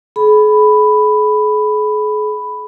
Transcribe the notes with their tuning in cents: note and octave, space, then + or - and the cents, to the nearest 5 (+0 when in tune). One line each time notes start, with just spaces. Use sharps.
G#4 +40 B5 +5